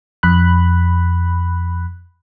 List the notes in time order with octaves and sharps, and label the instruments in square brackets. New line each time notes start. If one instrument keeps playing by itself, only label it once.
[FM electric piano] F2 B5 F#6